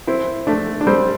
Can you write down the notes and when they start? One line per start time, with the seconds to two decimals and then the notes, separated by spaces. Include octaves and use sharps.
0.07 C4 E4
0.47 A3 D4
0.81 D4
0.87 G3 C4